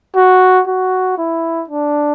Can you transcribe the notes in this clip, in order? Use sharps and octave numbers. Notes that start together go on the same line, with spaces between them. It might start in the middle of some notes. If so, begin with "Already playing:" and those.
F#4
F#4
E4
D4